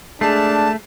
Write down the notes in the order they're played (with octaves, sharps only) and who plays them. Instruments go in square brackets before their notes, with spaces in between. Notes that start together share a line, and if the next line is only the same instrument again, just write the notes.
[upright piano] G#3 G#4 C7 [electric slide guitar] A3 [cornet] D4 [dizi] A5